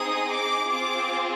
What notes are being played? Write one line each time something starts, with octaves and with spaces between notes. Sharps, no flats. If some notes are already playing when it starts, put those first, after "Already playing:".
Already playing: C4 D#4 G#4 D#6
D6
C4 F4 G#4 D6